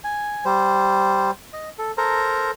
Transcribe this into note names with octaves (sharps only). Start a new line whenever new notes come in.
G#5
G3 C5
D#5
A4
A4 A#4 C5 A#5